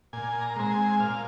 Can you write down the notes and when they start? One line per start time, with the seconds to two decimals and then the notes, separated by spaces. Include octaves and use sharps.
0.13 A#2 G#5
0.41 A#5
0.56 G#3 C4 A#5
0.71 G#5
1.00 A#2 F5